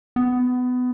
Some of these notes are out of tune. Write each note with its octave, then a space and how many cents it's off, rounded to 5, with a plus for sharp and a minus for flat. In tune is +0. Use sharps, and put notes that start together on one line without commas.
B3 +20